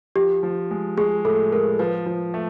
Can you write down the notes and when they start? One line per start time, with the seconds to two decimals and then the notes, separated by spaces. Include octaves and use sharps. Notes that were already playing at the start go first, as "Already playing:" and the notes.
0.16 F3 G4
0.43 F3
0.71 G#3
0.97 G#3 G#4
1.25 A2 A4
1.52 G#3 A#4
1.79 F3 B4
2.06 F3
2.34 A3